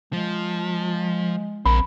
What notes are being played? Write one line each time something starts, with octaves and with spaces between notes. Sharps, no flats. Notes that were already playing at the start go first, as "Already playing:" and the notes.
F3 G#3
A#1 C4 A#4 B5